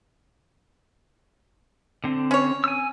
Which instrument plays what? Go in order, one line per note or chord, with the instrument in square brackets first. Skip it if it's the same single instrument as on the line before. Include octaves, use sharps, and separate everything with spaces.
[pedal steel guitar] D3 C4
[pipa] C#4 C#5
[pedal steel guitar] G#5 E6